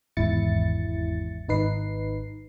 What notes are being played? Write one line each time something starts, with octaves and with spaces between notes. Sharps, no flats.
G#1 E2 G#2 E4 A6 C#7
G#1 D#4 B4 C7